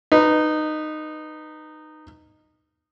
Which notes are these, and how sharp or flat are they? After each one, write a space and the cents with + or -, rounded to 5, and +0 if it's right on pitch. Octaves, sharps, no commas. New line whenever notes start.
D#4 -15 B4 +0